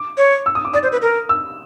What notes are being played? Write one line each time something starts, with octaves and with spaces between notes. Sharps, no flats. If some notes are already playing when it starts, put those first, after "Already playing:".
Already playing: D6
C#5
E6
D#6
D6
D5 D#6
C5
B4
A#4
E6